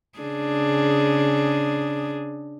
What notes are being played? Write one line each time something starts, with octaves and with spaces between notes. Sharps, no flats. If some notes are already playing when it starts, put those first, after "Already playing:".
C#3 D4 G#4